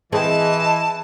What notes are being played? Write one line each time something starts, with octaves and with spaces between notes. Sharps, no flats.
E3 C4 G#4 D#5 A5